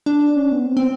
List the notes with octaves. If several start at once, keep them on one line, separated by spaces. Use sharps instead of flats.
D4
C#4
B3
C4
C4